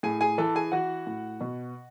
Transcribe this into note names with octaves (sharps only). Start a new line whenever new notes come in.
A2 G#4 G#5
G#4 G#5
E3 A4 A5
G#4 G#5
E3 F#4 F#5
A2
B2